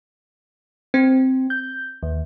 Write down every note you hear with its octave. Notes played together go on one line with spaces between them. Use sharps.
C4
G6
D#2